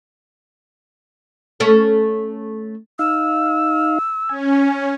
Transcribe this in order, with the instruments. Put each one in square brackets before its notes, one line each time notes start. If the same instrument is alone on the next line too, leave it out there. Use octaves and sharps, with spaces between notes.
[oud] A3 C#4 A4
[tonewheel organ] D#4 F5 [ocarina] E6
[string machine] C#4 [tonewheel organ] G#5